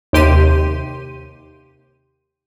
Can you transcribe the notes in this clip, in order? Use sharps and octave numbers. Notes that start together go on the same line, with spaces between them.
D#2 C3 G4 C6 D#7